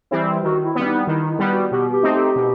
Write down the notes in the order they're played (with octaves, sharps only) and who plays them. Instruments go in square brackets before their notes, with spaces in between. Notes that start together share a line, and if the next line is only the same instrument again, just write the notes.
[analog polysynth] E3 G3 C4 E4
[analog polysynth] D#3 [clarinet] F#4
[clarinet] E4
[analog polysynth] G3 B3 [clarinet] C4
[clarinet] D#4
[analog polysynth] D#3 [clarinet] E4
[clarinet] E4
[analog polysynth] G3 B3
[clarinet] F#4
[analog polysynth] B2 [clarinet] G4
[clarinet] G4
[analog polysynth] A3 C4 D#4
[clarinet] G4
[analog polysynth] B2